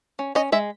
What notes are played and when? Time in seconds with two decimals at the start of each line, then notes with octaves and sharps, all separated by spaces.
0.19 C#4
0.35 C#4 D#5
0.52 G#3 E5